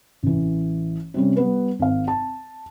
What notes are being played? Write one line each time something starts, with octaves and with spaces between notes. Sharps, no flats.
A1 E3
C3 G3 C#4
G3 B3 B4
G#1 F5
A5